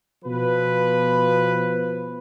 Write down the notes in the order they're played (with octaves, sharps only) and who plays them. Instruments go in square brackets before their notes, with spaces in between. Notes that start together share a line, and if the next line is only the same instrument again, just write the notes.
[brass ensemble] B2 F3 B4